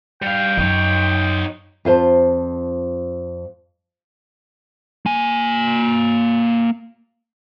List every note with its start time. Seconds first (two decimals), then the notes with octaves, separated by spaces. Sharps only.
0.22 G3 F5 G5
0.58 F#2 D#4 C#5
1.85 F2 F4 C5 A5
5.06 A#3 G#5